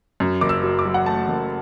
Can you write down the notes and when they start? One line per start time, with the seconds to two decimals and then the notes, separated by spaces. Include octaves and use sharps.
0.20 F#2
0.41 F#1 D6
0.49 E6
0.63 F#3
0.79 D6
0.85 F#3
0.94 F#5
1.06 A3 A5
1.28 F#1